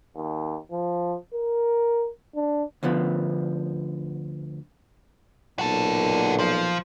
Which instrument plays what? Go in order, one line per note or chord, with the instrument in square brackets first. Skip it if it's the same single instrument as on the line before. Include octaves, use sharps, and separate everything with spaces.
[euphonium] D#2
F3
A#4
D4
[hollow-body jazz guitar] D2 D3 F3 B3
[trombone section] B1 A#2 [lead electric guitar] F#4 A4
[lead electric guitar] F3